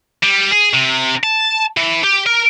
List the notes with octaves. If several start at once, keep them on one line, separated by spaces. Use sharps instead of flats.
G3
G#4
C3
A5
E3
G4
A#4